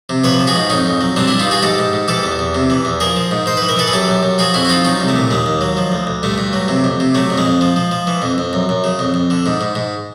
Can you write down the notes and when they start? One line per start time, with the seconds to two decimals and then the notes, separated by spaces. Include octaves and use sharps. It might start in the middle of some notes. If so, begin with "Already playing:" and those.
0.09 C3
0.24 F3 B4 C#5
0.39 F3
0.47 F#4 G#4
0.55 G#2
0.70 F2 C#4 D#4
0.86 F2
1.01 F#3
1.16 G2 C4 D4
1.28 G2 D4 E4
1.39 D#4 F4
1.47 G2 F#4 G#4
1.62 G#2 G4 A4
1.78 G#2
1.93 G#2
2.08 E3 G4 A4
2.23 E2
2.39 E2
2.55 C3
2.70 E3
2.85 E2
3.00 F3 G#4 A#4
3.16 F3
3.31 G#2
3.46 G#2 C5
3.57 E3 B4
3.69 A#4
3.77 E3 A4 B4
3.88 G#4
3.92 F#2 G4 A4
4.08 F#2
4.23 F#2
4.38 F3 F#4 G#4
4.54 F2 E4 F#4
4.65 F#4
4.69 F3 D#4 F4
4.84 F#3 C#4 D#4
5.00 C2
5.08 A3
5.16 A#2
5.30 D#2 G#3
5.46 D#2
5.61 F#3
5.77 F3
5.92 D2
6.07 D2
6.23 G2 A3
6.38 G2
6.53 F#3
6.68 C3
6.84 F2
7.00 C3
7.15 F#3 A3
7.30 F2
7.38 G#3
7.45 F2
7.61 F3
7.76 F3
7.91 F3
8.07 E3
8.22 F2
8.38 F2
8.53 F#2
8.69 F#2
8.84 C#3
8.99 F2
9.14 F2
9.30 D3
9.46 G#2
9.61 G#2
9.75 G#2